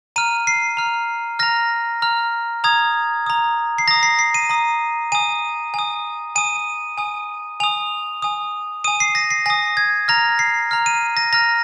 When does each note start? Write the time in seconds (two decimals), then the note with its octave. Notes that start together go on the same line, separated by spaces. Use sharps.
0.16 A#5 F6 D#7
0.47 C7
0.77 A#5 F6
1.39 A#5 F6 A#6
2.02 A#5 F6
2.64 A#5 D#6 G#6
3.26 A#5 D#6
3.78 C7
3.88 A#5 D#6 A#6
4.03 C7
4.19 C7
4.34 D#7
4.50 A#5 D#6
5.12 G#5 D#6 D#7
5.74 G#5 D#6
6.36 G#5 D#6 D#7
6.98 G#5 D#6
7.60 G#5 D#6 F7
8.22 G#5 D#6
8.84 G#5 D#6 D#7
9.00 C7
9.15 A#6
9.31 C7
9.46 G#5 D#6 A#6
9.77 G#6
10.08 A#5 F6 A#6
10.39 C7
10.71 A#5 F6
10.86 D#7
11.17 A#6
11.32 A#5 F6 A#6